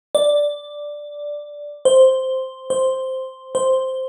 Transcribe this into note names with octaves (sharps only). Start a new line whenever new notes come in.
D5
C5
C5
C5